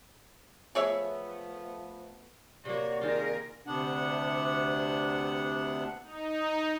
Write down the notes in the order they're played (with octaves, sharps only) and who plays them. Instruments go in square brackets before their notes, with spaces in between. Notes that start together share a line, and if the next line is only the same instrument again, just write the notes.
[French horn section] F3 A3 B3 [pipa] G#4 C#5 E5
[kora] C3 A#3 [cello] F#4 C#5 [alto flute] D5
[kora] D#3 F4 [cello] G#4 A#4
[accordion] D2 C3 B3 D4 F#5
[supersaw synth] D#4